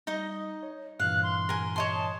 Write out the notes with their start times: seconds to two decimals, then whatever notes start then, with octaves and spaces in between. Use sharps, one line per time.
0.07 G3 D#4 D#5
0.63 C#5
1.00 G2 A#2 E3 F5 F#6
1.23 C6
1.49 A#4 G#5
1.76 C#5 D#5 A5 C6